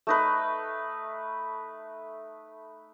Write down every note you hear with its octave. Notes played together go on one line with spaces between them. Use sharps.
A3 D#4 B4